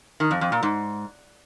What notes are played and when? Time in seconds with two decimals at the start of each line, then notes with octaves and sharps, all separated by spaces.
0.20 D#3
0.31 F2
0.41 F2
0.52 A#2
0.63 G#2